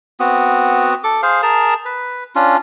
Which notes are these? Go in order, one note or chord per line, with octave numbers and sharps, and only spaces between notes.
B3 C4 F#4 D#6
A4 D6
G#4 C5 F5
G#4 A#4 A5
B4
C#4 D4 F4